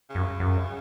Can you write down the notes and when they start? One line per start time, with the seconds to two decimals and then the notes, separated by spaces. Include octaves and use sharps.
0.10 C#3
0.15 F#2
0.40 F#2